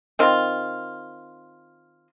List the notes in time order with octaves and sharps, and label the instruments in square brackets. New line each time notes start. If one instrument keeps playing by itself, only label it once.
[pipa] D#3 C4 F4